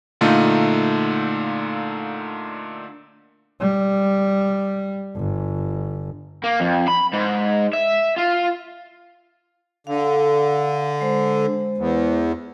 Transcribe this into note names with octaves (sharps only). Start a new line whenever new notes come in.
A#2 D3 A3 D#4 F4
G3
G1
A#3
F2
B5
G#2
E5
F4
D3 F5
G#3 C5
E2